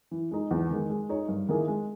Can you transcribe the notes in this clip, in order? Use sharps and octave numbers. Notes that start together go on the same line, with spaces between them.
E3
G#3 D#4
E2
D#3 G#3
G#3
D#4 G#4 C#5
G2
D#3 A#3 E4 G#4
G#3